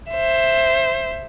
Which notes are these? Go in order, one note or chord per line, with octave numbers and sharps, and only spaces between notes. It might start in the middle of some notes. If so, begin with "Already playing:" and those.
C5 E5